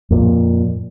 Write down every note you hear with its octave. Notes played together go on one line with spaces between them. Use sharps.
F2 A#2